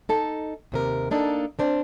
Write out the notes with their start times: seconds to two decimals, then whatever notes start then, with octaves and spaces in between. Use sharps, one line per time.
0.09 D#4 A4 A5
0.72 D#2 C3 A#4
1.11 A#3 D4 D#4 A4
1.59 C4 D4 C5